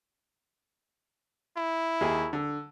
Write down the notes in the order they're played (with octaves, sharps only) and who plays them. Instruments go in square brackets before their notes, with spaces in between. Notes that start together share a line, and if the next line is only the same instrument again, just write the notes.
[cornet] E4
[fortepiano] D#2 G#4 E5
D3